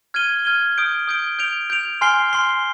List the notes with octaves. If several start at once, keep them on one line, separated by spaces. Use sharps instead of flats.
F6 G#6 D#7 G7
F6 G#6 D#7 G7
D#6 G6 D7 G7
D#6 G6 D7 G7
G6 D7 F7
G6 D7 F7
G#5 C6 F6 C7 G7
G#5 C6 F6 C7 G7